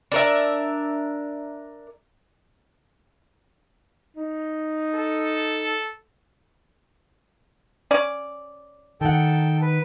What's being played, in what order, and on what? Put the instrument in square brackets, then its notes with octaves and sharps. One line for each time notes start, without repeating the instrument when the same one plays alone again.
[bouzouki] D4 A#4 E5
[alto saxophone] D#4
[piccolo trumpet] A4
[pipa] C#4 D5
[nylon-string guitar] D#3 F#5 [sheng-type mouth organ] A4 G5
[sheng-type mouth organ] B4